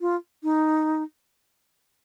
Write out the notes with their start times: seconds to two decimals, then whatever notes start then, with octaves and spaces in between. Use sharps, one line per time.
0.01 F4
0.43 D#4